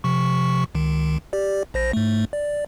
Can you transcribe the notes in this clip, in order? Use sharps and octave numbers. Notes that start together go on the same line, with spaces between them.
C3 F3 C#6
C#2 D#3
G4 D5
A#1 C5 A#6
G#2 A3
D5